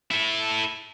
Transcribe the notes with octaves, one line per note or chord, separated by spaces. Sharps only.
E4 A4